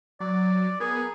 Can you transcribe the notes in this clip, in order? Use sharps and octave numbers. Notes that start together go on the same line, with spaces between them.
F#3 D5
B3 G#4 A#4